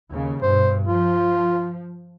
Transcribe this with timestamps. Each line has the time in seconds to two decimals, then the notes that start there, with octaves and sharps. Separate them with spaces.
0.12 D#2 C#3
0.42 G2 B2 C5
0.86 F3 F4